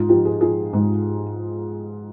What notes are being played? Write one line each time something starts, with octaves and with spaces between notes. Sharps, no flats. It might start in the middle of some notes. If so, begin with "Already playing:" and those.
Already playing: G#2 D#4 F4
F3 G4
G#4
F3 G#4
G#2